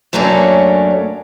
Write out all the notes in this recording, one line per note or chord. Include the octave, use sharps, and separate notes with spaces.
F#2 F#3 A3 A#3 C#4 D4